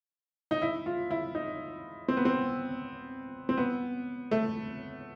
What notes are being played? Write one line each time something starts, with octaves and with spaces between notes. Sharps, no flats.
D#4
E4
F4
E4
D#4
C4
B3
C4
C4
B3
A3